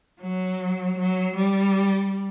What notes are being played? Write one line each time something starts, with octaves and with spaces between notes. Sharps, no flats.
F#3
F#3
G3